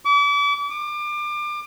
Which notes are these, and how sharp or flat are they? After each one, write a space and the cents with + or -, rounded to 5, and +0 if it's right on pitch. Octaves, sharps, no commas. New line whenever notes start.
D6 -40
D6 +30